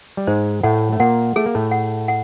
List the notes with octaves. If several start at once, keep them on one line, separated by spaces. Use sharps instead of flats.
G3
G#2 G#3 C5
A2 A3 F#5
A3
A#2 A#3 F#5
A3 G#4
A#3
A2 A3
F#5
F#5